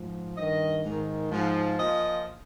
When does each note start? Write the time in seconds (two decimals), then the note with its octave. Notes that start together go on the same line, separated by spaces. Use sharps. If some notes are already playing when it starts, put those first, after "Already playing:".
Already playing: G#2 F3
0.36 G2 D#3 D#5
0.84 G#2 D#3
1.30 G#2 F3
1.79 A#2 F3 D#5